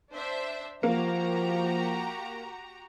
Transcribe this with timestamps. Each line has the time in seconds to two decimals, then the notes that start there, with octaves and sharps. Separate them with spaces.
0.13 D4 C5 E5
0.83 F3 A#3 F#4 G4 A#5